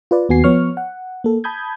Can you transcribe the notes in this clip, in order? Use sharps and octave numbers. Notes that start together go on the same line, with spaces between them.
F4 B4 D5
D#2 B3 F#4 G#5 C7
F3 B3 C#5 C#6 F6
F#5
A#3 A4
A5 B5 D#6 G6 G#6